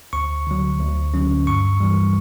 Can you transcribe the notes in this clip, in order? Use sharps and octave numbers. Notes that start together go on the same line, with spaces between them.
D2 C#6
D3 F#3
D2
D3 F#3 C#4
G2 C#6
E3 G3